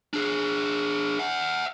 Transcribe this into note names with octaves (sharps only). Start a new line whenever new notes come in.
D4 G#4
E5 F#5